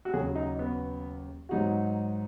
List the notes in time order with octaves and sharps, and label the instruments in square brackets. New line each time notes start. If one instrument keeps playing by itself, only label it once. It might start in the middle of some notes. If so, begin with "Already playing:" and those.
[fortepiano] F#4
[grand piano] D#2 C#3 F#3 [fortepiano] G#4
[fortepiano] D#4
B3
[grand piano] G#2 F#3 D#4 F#4